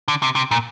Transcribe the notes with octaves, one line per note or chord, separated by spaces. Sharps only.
D3
C3
C3
A#2